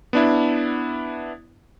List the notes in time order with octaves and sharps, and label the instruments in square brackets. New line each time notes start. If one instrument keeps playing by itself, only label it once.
[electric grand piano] B3 D4 E4